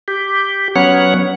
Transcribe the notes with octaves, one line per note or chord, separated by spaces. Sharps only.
G4
F#3 B3 C#4 C#5 F#5